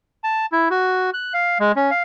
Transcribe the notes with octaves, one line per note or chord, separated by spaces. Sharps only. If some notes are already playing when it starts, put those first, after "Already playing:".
A5
E4
F#4
F#6
F5
G#3
C#4
F5